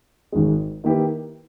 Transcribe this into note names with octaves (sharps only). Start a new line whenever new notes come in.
G#1 G#2 D#3 G#3
D#3 A#3 E4 G4 B4